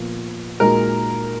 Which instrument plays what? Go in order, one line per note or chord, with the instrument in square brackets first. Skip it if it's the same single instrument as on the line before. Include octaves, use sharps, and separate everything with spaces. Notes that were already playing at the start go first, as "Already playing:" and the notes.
Already playing: [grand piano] A#2 F3 B3 F4
[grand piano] A#2 G#3 D#4 F#4 [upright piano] A#4